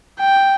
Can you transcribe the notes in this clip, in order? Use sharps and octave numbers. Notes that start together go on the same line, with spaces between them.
G5